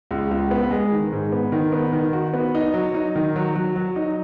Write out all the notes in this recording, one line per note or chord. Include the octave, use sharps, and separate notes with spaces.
C#2
C#2
B3
G#3
D#3
G#2
B3
D#3
B3
D#3
F#4
B3
D#4
F#3
D#4
D#3
F#3
F#3
F#3
D#4